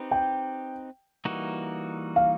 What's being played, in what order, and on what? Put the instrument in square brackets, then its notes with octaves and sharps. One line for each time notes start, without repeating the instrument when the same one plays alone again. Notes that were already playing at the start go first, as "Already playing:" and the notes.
Already playing: [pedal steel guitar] C4 D#4 G4 B4
[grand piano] G5
[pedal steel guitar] E3 G3 A#3 D#4 F#4
[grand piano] F5